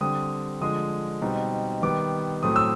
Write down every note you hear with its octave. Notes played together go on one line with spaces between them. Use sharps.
D3 G3 C4 D#6
D3 F3 G#3 D#6
B2 G3 C4 D#4
D#3 G3 B3 D6
A2 F#3 A3 C4 D#6
E6